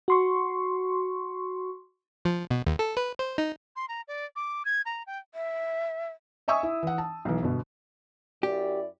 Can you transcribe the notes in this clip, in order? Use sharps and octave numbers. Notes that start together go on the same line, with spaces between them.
F#4 C6 C#6
F3
B2
D#2
A4
B4
C5
D#4
C6
A#5
D5
D6
G#6
A#5
G5
E5
D#5 E5 G#5 C#6 D#6 E6
E4
E3 F#5
A5
B1 E3
G1 B2
F#2 E4 G4 D5